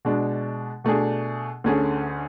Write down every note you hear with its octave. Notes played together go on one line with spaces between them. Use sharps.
B2 G#3 D4
B2 A3 D4 G#4
D2 D3 A3 C#4 G#4